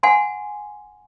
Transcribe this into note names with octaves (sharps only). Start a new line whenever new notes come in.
F#5 G#5 C6